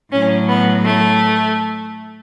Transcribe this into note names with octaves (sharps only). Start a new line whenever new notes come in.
A2 F#3 C#4
B3
A3